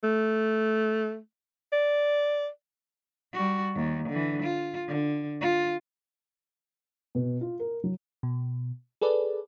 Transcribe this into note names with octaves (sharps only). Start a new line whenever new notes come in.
A3
D5
G3 F#4
D#2
D3 E3
F4
D3
F4
B2
F4
A#4
F#3
B2
G#4 A4 B4 D5